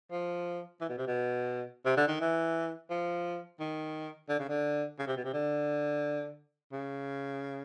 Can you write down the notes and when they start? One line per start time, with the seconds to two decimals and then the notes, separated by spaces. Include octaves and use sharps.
0.11 F3
0.81 E3
0.89 B2
0.98 C3
1.07 B2
1.85 C3
1.97 D3
2.08 D#3
2.20 E3
2.90 F3
3.60 D#3
4.29 D3
4.39 C#3
4.49 D3
4.99 C#3
5.07 C3
5.17 B2
5.25 C3
5.33 D3
6.72 C#3